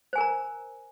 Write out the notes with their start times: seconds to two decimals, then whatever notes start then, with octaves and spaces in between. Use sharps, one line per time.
0.13 C5
0.15 G#5
0.18 A#4
0.21 A#5